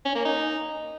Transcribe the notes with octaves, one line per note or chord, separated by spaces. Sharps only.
C#4
A#3
D#4